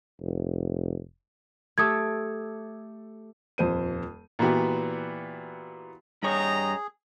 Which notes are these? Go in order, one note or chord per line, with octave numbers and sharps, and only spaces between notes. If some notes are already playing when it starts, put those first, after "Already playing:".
F1
A3 G4 A4 D#6 G#6
D#1 F2 C5 D#7
A#2 E3 B3 F#4 G4
G2 G#4 C#5 D#5 G5 A#5